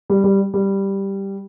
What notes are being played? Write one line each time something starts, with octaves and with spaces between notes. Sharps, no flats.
G3
G3
G3